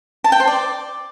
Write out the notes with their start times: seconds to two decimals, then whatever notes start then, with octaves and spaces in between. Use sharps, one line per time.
0.24 A5
0.32 G5
0.40 C5
0.48 D5